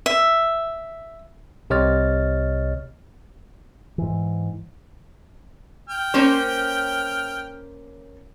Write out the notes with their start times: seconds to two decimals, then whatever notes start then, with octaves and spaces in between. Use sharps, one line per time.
0.06 E5
1.70 C2 C3 C#5 D#5 F6 A6
3.98 G#2 E3
5.89 G5 F6
6.14 A#3 C#4 C5